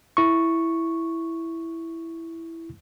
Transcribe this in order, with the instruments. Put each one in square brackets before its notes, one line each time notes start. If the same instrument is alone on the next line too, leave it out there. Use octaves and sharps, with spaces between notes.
[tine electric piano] E4 C#6